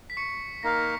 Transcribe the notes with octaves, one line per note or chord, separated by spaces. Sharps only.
B6
C#6 C#7
A#3 D#4 A#4 F5 A#6